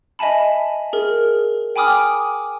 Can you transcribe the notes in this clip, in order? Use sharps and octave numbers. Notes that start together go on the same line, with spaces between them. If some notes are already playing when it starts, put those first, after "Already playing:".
D#5 E5 G#5 A5 B5
G#4 A#4
G5 G#5 B5 D6 D#6 F6